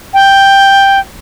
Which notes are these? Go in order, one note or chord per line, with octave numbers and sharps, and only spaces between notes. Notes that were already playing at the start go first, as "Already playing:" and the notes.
G5